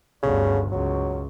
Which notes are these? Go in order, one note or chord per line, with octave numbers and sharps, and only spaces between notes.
G1 D2 C#3
C#2 F#3